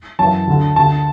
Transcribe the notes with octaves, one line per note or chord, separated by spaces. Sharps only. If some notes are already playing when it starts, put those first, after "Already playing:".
F#2 E3 A5
D2 D3
D2 D3 A5